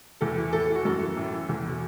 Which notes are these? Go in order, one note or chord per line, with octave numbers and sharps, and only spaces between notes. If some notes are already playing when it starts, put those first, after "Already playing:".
E2 A4
E3
A2 A4
E3 F#4
F#2 A4
E3
A2
E3
E2
B2